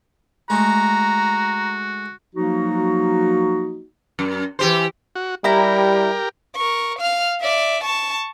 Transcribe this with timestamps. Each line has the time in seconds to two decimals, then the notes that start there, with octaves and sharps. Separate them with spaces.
0.50 G#3 A3 F#4 A#5
2.36 F3 F#3 A#3 D#4 F#4
4.19 F#2
4.59 E3 G4 C5
5.15 F#4
5.44 G3 E4 G4 A#4 A#5
6.56 A#4 C#6
6.99 F5 F6
7.41 D5 E5
7.84 A5 C#6